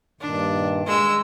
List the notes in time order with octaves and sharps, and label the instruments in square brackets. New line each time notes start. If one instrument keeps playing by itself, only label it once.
[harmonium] G2 A#2 D#3 [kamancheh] D4
[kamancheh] G#3 E6